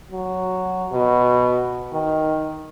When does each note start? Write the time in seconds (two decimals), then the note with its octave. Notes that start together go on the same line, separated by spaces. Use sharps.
0.11 F#3
0.92 B2
1.93 D#3